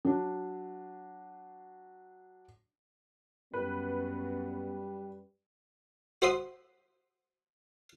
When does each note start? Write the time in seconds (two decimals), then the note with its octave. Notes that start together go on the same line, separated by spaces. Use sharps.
0.05 F#3 D4
3.54 F#2 G3 B3 B4
6.22 F#4 C5 E5 C6 D#6